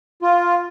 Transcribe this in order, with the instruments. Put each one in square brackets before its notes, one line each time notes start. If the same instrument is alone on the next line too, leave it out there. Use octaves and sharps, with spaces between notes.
[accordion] F4